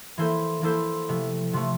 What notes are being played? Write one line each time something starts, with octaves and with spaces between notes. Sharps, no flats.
E3 A#3 E4 A4 C5
E3 A#3 E4 A4 C5
C3 F3 A3
C3 F3 A3